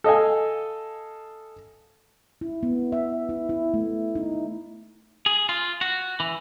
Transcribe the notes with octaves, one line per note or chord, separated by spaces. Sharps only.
A4 D#5 F5 G#5
E4
B3
E5
E4
E4
A3
D#4
G#4
F4
F#4
E3